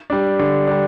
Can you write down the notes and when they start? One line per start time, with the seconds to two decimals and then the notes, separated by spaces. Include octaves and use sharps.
0.10 G3 D4
0.39 D3
0.67 G3 D4